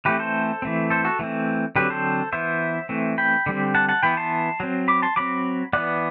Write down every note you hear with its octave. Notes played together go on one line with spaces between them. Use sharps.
E3 A3 C4 G4 B4
A4 C5
E3 A3 C4
A4 C5
F#4 A4
E3 A3 C4
D3 F#3 C4 G4 B4
A4 C5
E3 B3 C5 E5
E3 A3 C4
G5 B5
D3 G3 C4
F#5 A5
F#5 A5
E3 B3 G5 B5
A5 C6
F#3 C4
B5 D6
A5 C6
F#3 C4 B5 D6
E3 B3 D5 F#5